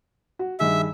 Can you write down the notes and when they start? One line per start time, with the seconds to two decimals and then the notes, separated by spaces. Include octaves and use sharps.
0.39 F#4
0.60 G2 D#3 G#4 E5